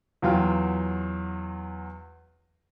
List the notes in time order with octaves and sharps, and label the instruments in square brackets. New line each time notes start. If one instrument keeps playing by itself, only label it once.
[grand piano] E2 F#3 F4 G5